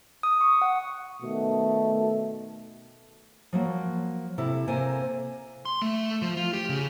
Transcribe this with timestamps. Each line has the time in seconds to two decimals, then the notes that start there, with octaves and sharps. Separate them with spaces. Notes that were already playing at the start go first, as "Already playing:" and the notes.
0.23 D#6
0.41 C#6
0.62 F#5
1.21 B2 D#3 A3
3.53 F3 F#3 A#3
4.38 C3 E4 A4
4.68 C3 A#3 A4 A#4 C5 G#5
5.66 C6
5.82 A3
6.22 F3
6.37 F4
6.53 G4
6.69 C#3